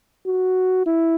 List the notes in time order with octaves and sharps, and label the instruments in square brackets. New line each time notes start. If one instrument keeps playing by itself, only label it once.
[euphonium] F#4
E4